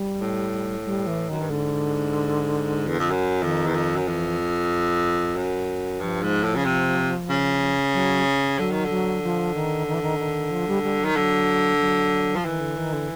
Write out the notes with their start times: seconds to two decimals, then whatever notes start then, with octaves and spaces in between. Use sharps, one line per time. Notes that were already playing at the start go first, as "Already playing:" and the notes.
Already playing: G3
0.21 A2
0.85 G3
1.07 E3
1.29 F#2 D#3
1.40 G2
1.50 G#2 D3
2.87 E2
2.99 F2
3.10 F#2
3.43 F2 D#3
3.67 E2
3.75 F2
3.96 F#2
4.07 F2 E3
5.36 F#2
6.00 G2 F3
6.22 G#2
6.44 A2
6.56 C#3
6.65 C3
7.29 C#3
7.93 F#3
8.58 D3 F#3
8.71 D#3
8.84 D3
8.90 F#3
9.23 F3
9.55 D#3
9.88 D#3
9.94 E3
10.02 D#3
10.19 D#3
10.51 F3
10.68 G3
10.83 G3
11.00 D#3 F#3
11.15 D3 F#3
11.80 F#3
12.36 F3
12.45 D#3 E3
12.60 D3
12.77 D#3
12.93 D3